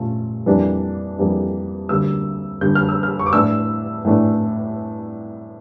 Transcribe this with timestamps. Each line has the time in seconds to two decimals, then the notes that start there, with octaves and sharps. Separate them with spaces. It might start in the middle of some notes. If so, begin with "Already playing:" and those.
Already playing: A#2 A3 C#4 F4
0.46 F2 E3 G3 A#3 D4
1.18 F2 E3 G3 A#3 D4
1.89 D2 D3 G3 A#3 E6
2.61 D2 D3 G3 A#3 G6
2.75 F6
2.89 E6
3.03 F6
3.19 C#6
3.26 D6
3.33 A2 E3 A3 D4 E6
4.05 A2 E3 A3 D4